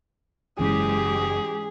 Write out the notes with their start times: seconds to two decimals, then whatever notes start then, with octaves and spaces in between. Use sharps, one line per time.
0.59 F#1 G#2 E3 G#3 C#4 G4 G#4